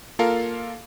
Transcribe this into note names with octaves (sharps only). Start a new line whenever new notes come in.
A#3 F4 A4 A#4 F5